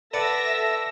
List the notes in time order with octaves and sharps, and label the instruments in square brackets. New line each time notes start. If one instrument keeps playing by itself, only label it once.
[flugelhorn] A4 [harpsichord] B4 D5 F#5 [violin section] E5 E6 A#6